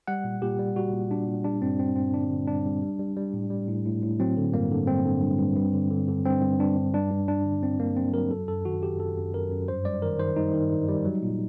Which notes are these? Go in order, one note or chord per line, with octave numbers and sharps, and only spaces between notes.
G3 F#5
A#2
A#2 G4
G3
G3 F#4
A#2
G3 D4
A#2
G3 D4
G2 C4
G2 C4
G2 C4
D3 D4
D3
G2 D4
G3
G3
G3
G3
A2
G3
A2
A2
A2
F#3 C4
D3
G2 A#3
D3
G2 C4
D3
G2
G2
G2
D3
D3
D3
G2 C4
G2
G2 D4
G2
G2 D4
G2
G2 D4
D3
G2 C4
G2 A#3
F#3 C4
F#3 A#4
F#2 A4
F#2 A4
D#3 F#4
F#2 G4
F#2 A4
F#2
F#2 A#4
F#2
G2 C5
G3 D5
D#3 A#4
D#3 C5
G3 D#4
D#3
G2
G3
F#3
A#2